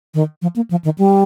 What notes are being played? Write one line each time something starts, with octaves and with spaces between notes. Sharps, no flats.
D#3
F3
A#3
F3
D#3
G3